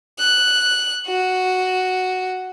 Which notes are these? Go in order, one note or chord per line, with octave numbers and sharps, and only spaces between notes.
F#6
F#4